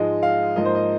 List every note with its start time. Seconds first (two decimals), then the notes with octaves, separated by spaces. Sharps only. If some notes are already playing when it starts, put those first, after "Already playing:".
Already playing: G#2 F3 G#3 D#5
0.23 F5
0.56 G#2 F3 A#3 D#5
0.65 C5
0.75 D#5